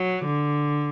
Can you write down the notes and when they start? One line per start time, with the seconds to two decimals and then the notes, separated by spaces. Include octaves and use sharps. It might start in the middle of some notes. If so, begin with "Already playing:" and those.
Already playing: F#3
0.25 D3